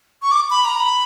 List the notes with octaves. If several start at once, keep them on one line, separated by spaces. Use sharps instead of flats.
C#6
D6
B5
A#5
B5